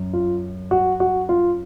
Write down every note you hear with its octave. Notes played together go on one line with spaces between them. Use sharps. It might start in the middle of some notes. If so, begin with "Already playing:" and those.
Already playing: F#2
F4
F#4
F#4
F4